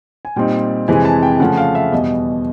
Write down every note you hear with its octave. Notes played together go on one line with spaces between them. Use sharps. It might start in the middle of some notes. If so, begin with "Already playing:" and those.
G#5
A#2 G3 C4 D#4 G5
F2 C3 E3 G#3 G#5
A5
G5
C#3 F3 A3 F#5
F5
E5
E2 B2 G3 D#5